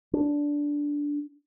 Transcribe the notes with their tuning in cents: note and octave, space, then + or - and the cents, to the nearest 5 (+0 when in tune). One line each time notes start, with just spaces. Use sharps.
D4 -10